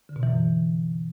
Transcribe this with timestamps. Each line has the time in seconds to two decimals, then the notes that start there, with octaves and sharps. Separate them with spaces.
0.09 D3
0.16 B2
0.23 E3
0.30 F#2